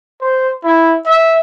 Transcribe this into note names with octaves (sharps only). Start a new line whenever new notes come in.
C5
E4
E5